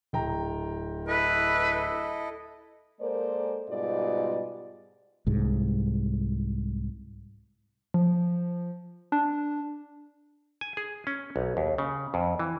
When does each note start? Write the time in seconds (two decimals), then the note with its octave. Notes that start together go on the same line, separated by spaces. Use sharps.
0.13 D1 G5 A#5
1.07 E4 A4 B4 D#5
3.01 G#3 A#3 A4 A#4 C5 D5
3.69 G#2 B2 G3 F4 D5 D#5
5.27 C2 G#2
7.94 F3
9.12 D4
10.61 G#5
10.77 G#4
11.07 C#4
11.36 B1
11.57 D#2
11.78 C#3
12.14 F2
12.39 E3